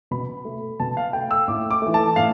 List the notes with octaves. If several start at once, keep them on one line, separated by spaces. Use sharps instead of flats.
B2 B5
A3
B2 A5
F5
A3 G5
E6
A2 D6
D6
E3 A3
A5
A2 F5